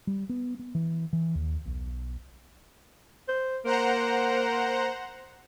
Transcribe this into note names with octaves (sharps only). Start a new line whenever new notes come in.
G3
B3
B3
E3
E3
D#2
B1
C5
A#3 C5 F#5 A#5